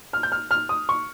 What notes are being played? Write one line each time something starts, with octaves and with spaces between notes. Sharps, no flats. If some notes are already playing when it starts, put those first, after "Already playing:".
F6
G6
F6
F6
D#6
C#6